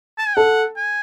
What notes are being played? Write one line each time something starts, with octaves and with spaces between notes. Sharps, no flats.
A5
G#5
A4 F#5
G#5